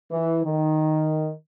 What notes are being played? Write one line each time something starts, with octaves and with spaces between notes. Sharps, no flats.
E3
D#3